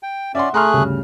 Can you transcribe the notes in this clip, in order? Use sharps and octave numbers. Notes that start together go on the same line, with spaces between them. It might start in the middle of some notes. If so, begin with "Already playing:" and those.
G5
C#4 D5 E5 F#5 C6
A3 G#4 A#5 C6 F6 F#6
D2 G2 C#3